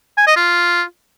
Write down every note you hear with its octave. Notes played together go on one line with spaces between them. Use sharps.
G#5
D#5
F4